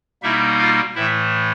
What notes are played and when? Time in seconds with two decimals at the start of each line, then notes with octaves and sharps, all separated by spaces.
0.22 B2 G3 A#3 D#4 E4 E5
0.58 F4 F5
0.95 A2 E3 A3 E4 E5